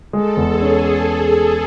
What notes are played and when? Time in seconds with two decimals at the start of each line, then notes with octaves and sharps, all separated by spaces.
0.13 G#3 A4
0.37 E2
0.50 G#4
0.62 C#4